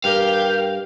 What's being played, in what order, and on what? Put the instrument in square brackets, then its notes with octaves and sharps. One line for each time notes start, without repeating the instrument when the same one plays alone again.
[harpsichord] G2 [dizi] G4 [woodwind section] A#4 G5 [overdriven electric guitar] F5